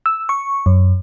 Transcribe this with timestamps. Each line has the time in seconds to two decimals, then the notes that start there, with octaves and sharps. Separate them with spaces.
0.06 E6
0.29 C#6
0.66 F#2